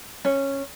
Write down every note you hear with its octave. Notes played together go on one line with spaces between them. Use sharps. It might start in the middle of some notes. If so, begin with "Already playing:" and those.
C#4